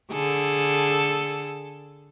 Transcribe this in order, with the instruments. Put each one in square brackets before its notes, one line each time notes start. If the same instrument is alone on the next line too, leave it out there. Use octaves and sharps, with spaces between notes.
[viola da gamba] D3 G#4 A4